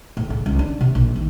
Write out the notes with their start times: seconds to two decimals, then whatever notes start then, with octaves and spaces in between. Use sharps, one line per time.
0.17 A2
0.30 C#3
0.46 C#2
0.59 D4
0.81 C3
0.95 A#1
1.16 D#2